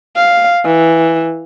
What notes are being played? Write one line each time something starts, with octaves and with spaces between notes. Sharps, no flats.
F5
E3